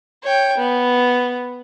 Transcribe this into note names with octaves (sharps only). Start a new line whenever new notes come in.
C#5 G5
B3